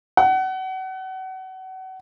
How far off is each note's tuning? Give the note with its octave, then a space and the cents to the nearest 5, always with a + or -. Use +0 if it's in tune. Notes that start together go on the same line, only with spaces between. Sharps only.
F#5 +30